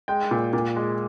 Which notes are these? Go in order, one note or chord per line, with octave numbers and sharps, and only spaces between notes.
G#3 G5
A#2
A#2
G#3